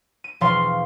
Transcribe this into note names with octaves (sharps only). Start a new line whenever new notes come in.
D#7
E1 F3 F5 C6